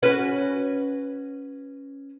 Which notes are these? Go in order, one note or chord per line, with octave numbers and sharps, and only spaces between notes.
C#4 F#4 B4